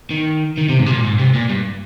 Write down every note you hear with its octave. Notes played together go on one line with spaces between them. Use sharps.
D#3
D#3
C3
G#2
C3
A#2
G#2
C3
A#2
G2